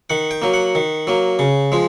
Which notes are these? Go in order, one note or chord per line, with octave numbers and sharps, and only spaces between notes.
D#3 F#5
G5
F#3 A#3
F#5
D#3
F#3 A#3
C#3
F3 G#3